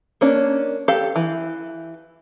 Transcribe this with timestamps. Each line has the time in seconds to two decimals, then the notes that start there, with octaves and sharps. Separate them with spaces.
0.21 A#3 C#4 D4
0.88 G4 A4 F5
1.16 E3